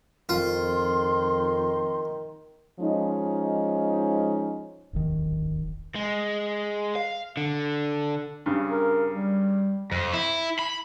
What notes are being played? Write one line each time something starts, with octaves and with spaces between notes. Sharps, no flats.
F2 D#3 F4 C6
F3 G#3 C#4 D#4
D1 G#1 E2 D#3
G#3
F5
D3
G2 C#3
A#4
G3
F2
E4
B5